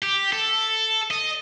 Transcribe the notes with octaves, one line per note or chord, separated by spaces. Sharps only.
G4
A4
D#5